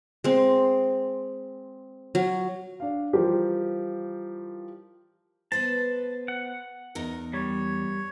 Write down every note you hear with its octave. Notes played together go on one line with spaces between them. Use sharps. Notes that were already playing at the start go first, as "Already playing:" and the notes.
G#3 C4
F#3
D4 F5
E3 F3 G3 F4 G4 A#4
B3 B4 C5 A5
F#5
E2 D#4 A#4
G3 C#5